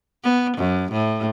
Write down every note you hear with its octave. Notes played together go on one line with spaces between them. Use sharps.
B3
F#2
A2